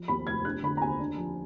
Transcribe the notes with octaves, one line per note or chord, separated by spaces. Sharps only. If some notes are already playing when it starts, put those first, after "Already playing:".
Already playing: F3
D#2 B5
F1 G#6
D4 F#6
D3 B5
A#5
D#2 G#5
D4
F3